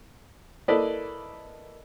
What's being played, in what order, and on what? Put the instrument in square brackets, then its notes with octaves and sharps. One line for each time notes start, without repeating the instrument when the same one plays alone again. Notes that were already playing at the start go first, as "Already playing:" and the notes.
[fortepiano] A#3 E4 A4 B4 D5 D#5